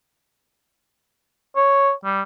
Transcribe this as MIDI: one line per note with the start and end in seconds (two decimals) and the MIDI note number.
1.56 1.92 73
2.04 2.22 55